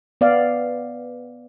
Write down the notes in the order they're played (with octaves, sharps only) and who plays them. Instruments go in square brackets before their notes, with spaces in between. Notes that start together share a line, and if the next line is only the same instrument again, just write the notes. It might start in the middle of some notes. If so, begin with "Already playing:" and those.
[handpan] B3 D5 F5